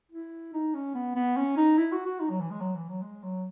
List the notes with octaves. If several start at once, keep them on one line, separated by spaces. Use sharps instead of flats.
E4
D#4
C#4
B3
B3
C#4
D#4
E4
F#4
F#4
D#4
F#3
E3
G#3
F#3
E3
F#3
G#3
F#3